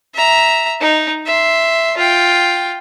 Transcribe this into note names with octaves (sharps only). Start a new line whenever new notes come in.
E5 A#5
D#4
E5 C6
F4 G5